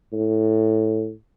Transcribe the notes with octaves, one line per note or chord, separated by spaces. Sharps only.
A2